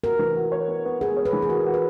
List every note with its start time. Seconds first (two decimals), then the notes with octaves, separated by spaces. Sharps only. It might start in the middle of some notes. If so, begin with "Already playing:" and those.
0.04 F#4 A#4
0.19 E3
0.37 F#4
0.52 C#5
0.68 B3
0.85 B3
1.01 B3 G#4
1.17 C#5
1.25 B4
1.33 E3
1.42 G#4
1.49 F#4 A#4
1.66 F#4
1.74 B4